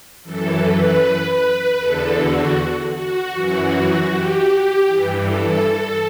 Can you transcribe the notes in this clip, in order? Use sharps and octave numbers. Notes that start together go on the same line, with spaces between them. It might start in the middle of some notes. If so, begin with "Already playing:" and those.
F#2 E3 A4
B4
E2 D3 A4
F#4
F#4
F#2 E3 F#4
G4
G2 E3
A4
A4